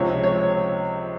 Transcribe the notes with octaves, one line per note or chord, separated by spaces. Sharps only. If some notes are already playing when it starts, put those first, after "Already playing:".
Already playing: C#2 C3 F3 C4 C#5
C#5